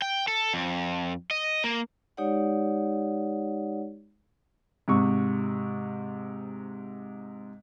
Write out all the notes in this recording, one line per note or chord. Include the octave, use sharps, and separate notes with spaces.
G5
A4
F2
D#5
A#3
G#3 D#4 G4 C#5 D5 F#5
G#2 C3 C#6